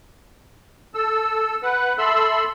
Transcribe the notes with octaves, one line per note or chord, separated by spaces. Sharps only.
A4 E6
B4 F#5
A4 E5 B5 C6 E6